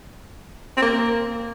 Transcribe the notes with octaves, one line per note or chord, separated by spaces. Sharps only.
C4
A#3